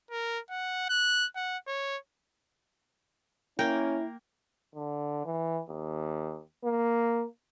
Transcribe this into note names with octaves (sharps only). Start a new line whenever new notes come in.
A#4
F#5
F#6
F#5
C#5
A#3 C#4 E4 A#4 G5
D3
E3
D#2
A#3